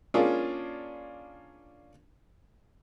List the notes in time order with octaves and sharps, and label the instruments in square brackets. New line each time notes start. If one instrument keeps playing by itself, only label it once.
[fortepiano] A#3 C#4 D4 F4 G#4